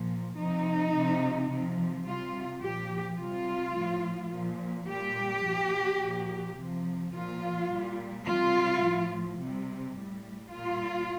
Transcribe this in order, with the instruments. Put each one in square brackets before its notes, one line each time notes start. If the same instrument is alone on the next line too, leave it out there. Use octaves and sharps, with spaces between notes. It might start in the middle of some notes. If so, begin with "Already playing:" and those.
Already playing: [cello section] A#2 F3
C3 F3 D#4
C3 F3
C3 F3
C3 G3 F4
A#2 F3 G4
C3 G3 F4
A2 F3
A#2 F3
A#2 G3 G4
A#2 F3
A#2 F3
C3 F3
A#2 F3 F4
A#2 G3
C3 G3 F4
A2 F3
C3 G3
A2 G3
A#2 G3 F4